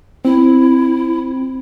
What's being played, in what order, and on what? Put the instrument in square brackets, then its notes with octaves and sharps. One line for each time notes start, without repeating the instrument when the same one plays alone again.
[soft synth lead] C4 [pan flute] E4